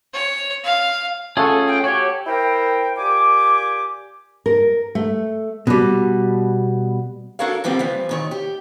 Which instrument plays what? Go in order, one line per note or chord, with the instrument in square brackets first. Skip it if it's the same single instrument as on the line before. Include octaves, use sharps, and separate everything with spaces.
[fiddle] C#5
F5
[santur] A3 F#5 [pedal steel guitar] C#4 F4 G#4 [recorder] A4
[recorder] G5
[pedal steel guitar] F#4 G4 [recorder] C#5
[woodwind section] E4 A#4 C5 G5
A#2 G4 G#5 D6
[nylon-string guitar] A#4
A3
[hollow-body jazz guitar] B2 G3
[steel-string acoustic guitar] D4 F#4 A4 A#4 C#5 F5
D3 F3 G3 A#3 C4
G2 E3 F3
A#2 D#3 C#5
G4